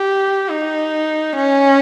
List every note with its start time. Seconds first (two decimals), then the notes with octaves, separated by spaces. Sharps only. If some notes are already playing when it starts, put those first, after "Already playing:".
Already playing: G4
0.49 D#4
1.36 C#4